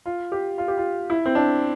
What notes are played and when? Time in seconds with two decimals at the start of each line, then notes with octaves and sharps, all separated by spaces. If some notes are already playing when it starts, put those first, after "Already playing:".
0.06 F4
0.32 G4
0.58 F4
0.68 G4
0.77 F4
1.10 E4
1.25 C4
1.35 D4